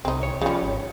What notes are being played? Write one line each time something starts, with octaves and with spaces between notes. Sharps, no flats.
C2 C4 D#4
C#5
C#3 F3 G3
G#1